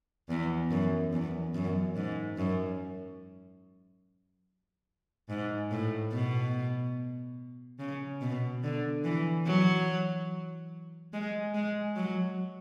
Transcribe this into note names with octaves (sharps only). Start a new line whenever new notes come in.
E2
F#2
E2
F#2
G#2
F#2
G#2
A2
B2
C#3
B2
D3
E3
F#3
G#3
G#3
F#3